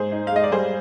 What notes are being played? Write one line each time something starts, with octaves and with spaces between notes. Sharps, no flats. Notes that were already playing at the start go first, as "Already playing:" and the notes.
Already playing: G#2 G#4 C5
D#4
F5
G#3 D#5
D5
G3 G#4 C5